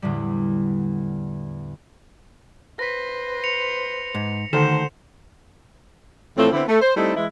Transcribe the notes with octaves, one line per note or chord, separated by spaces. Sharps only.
E2 A2 D3 G3
B4 C5 A#6 B6
C#7 F7
G#2
D2 D3 D#3 A4 C5 E7
A2 E3 F3 A3 C4
D3 B3 C4 E4
A3
C5
G3 A3 C4 D#4 E4 A4
E3 G#3 E4